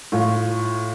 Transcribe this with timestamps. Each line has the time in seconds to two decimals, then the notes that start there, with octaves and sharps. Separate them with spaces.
0.12 A2 F4